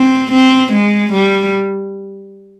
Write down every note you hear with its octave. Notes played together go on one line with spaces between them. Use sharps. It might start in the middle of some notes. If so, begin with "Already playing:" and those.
Already playing: C4
C4
G#3
G3